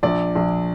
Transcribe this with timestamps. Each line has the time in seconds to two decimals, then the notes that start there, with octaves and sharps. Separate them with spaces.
0.03 A#1 D5
0.35 A#1